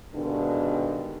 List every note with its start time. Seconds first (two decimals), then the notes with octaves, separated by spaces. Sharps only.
0.14 G2 B2 D3 D#3 G#3